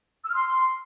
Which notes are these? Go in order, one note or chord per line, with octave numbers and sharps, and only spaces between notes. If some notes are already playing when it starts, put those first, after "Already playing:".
E6
F6
C6